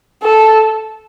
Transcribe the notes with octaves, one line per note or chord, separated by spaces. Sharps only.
A4